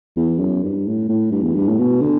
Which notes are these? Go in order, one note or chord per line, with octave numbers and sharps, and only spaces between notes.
E2
F#2
G2
A2
A2
G2
E2
G2
A2
B2
D3